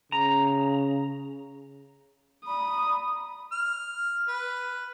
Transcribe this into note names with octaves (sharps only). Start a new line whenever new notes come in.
C#3 A#5
D5 A#5 B5 D#6
F6
B4